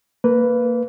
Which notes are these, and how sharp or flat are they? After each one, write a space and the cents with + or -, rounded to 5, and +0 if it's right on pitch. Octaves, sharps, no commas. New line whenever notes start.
A#3 -15 B4 +0